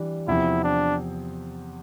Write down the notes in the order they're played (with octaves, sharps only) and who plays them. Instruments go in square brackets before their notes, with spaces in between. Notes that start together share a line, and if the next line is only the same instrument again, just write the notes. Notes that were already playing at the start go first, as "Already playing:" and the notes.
Already playing: [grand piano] E3 G3 D4
[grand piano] E2 C3 F3 C4 [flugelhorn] E4
[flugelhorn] D4